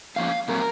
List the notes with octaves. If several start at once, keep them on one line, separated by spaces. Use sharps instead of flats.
G#2 F3 A#3 C#4 F5
A#2 F#3 C4 A#4